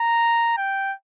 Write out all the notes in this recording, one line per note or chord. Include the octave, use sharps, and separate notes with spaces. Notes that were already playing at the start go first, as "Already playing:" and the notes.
Already playing: A#5
G5